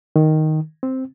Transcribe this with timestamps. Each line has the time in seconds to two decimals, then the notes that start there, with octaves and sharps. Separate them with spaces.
0.16 D#3
0.83 C4